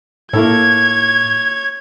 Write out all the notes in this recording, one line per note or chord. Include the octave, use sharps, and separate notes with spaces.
A2 A#3 E4 A4 C#5 G#6